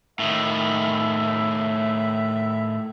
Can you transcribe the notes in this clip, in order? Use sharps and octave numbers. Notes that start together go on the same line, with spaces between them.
A2 D#3 E5